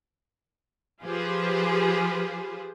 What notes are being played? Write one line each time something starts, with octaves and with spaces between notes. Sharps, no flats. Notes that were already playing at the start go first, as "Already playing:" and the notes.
F3 F4 G4 G#4 B4 C5